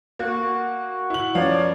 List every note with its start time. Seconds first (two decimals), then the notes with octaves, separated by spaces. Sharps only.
0.19 A#3 F#4
1.10 E4 F#7
1.35 F#2 F3 B3 C#5 D5 F5